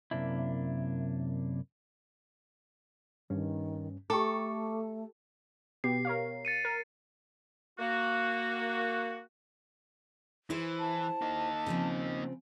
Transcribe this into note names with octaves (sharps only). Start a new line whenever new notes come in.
F#2 C3 A#3 D4 E4
G2 D#3 C#4
A3 G4 A4 G5 A#5 C#6 D6
B2 B3 G4 C7
A#4 C#5 F5
A6 C#7 D#7
A#4
A#3 F#4
E3 E4 G#4 C5
A5
A#3 D#4
C#3 F3 C4